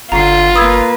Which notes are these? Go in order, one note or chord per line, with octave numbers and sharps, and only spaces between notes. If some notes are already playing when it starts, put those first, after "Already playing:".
G1 D3 F4 A#5 C7
A#3 B4 D#6 E6 G#6